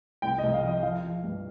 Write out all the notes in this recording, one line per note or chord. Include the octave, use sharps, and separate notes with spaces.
C2 G5
C2 D#5
F5
F3 D#5
F3 F5
F3
G2